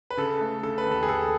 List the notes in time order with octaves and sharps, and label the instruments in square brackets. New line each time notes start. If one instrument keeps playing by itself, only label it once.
[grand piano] B4
C#3 A4
A3
C#3 A4
B4
D#2
A4
G#4
D#2 A4